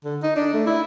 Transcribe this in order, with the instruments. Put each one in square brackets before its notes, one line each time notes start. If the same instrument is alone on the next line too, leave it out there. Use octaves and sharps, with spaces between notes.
[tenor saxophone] D3
D#4
D4
A3
E4